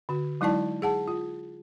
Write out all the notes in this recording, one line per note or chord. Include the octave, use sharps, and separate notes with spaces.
D3 F#4
F#3 G#3 D#4 E4 D5 A5
G#4 F#5 A5
F4